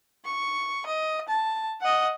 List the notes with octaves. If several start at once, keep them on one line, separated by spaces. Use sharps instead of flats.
C#6
D#5
A5
D#5 F#5